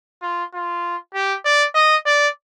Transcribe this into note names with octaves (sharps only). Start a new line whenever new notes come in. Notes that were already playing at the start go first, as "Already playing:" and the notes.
F4
F4
G4
D5
D#5
D5